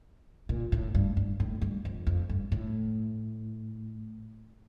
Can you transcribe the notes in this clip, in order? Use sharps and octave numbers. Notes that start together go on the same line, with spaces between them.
A#2
A2
G2
G2
A2
G2
F2
F2
G2
A2